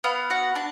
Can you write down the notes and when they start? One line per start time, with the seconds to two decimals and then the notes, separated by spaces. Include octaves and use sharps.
0.04 B3 F5
0.30 F#4 F#5
0.55 D4 A5